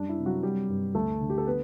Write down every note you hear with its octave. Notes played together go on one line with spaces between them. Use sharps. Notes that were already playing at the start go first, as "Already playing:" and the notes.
Already playing: F#2 G3 D4
E4
C3
F#3 F#4
F#3 G3 G4
G2
D2 A3 A4
D3
G4
A4
B3 B4